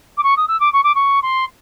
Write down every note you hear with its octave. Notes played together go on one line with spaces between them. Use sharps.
D6
C#6
D#6
E6
D6
C#6
D6
C#6
C6